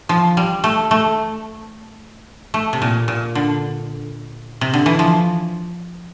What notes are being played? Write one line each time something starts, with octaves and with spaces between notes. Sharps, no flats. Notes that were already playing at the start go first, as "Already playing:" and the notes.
F3
G3
A3
A3
A3
C3
A#2
A#2
D3
C3
D3
E3
F3